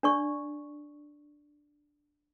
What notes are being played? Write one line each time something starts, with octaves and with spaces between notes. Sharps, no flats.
D4 D5 C#6